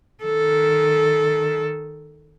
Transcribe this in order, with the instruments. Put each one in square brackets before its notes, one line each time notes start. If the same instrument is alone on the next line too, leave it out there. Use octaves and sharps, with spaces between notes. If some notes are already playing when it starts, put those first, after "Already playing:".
[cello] D#3 A4